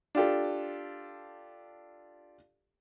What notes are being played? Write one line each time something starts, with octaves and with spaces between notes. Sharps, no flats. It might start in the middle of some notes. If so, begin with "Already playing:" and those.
D4 F4 G4 A4